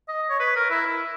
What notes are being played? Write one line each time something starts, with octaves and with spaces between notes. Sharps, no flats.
D#5
C#5
B4
A#4
E4
E4